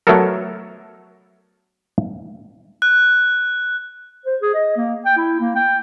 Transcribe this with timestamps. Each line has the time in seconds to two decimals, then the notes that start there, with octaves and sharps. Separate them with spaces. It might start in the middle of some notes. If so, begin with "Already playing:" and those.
0.07 F#3 A3 B3 D4 A4 A#4
2.82 F#6
4.25 C5
4.41 G#4
4.54 D#5
4.76 A#3
5.05 G5
5.17 E4
5.40 A#3
5.55 G5